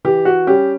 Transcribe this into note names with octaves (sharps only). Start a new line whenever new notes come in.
E3 G4
F#4
G3 C#4 G4